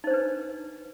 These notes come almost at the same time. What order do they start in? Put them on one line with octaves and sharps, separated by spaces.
D#4 C5 D4 B4